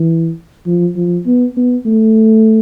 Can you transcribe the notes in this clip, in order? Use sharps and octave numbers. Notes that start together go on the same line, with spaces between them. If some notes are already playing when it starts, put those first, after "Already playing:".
Already playing: E3
F3
F3
B3
B3
A3